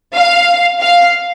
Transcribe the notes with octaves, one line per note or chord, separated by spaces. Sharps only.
F5
F5